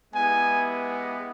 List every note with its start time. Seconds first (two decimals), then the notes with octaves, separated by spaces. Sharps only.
0.14 G#3 B3 E4 G4 G#5